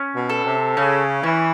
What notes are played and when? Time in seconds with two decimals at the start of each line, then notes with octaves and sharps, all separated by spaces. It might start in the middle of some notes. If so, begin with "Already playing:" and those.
Already playing: C#4
0.14 B2
0.30 A4
0.45 C3
0.77 C#3 C#4
1.23 E3 C#4